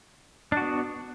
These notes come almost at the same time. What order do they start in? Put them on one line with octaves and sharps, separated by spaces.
D4 F#4 B3